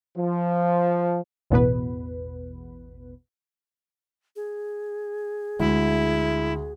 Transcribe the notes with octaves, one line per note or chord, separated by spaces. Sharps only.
F3
A1 E2 B2 B3 B4
G#4
D2 G#3 E4